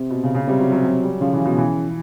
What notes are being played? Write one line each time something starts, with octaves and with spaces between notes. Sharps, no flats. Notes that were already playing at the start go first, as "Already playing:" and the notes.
Already playing: C3
B2
C#3
C#3
C3 G3
F#3
F#3
F#3
G3
C#3 F3
E3
B2
E3